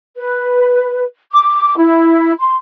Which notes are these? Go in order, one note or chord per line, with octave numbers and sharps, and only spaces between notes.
B4
D6
E4
C6